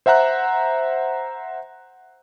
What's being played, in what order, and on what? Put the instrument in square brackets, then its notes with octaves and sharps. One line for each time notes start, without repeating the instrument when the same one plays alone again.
[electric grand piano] C5 E5 F#5 A#5 F#6